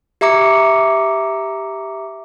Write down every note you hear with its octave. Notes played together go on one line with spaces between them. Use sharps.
G4 E5 A#5 D6 C#7